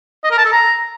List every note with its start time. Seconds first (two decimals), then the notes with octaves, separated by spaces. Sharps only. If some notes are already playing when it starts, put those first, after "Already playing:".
0.24 D#5
0.31 A#4
0.38 A5
0.45 A4
0.52 A#5